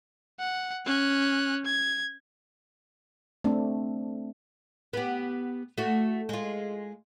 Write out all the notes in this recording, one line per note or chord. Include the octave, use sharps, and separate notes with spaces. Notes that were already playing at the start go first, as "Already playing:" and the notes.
F#5
C#4 F#6
G#6
A3 C4 D4
B3 G4
A3 F#4
G#3 F4